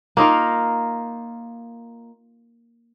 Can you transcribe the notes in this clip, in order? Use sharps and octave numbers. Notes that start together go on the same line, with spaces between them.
A#3 D#4 F4 A#4